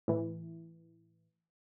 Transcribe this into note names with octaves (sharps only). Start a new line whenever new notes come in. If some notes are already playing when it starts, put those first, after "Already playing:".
A2 E3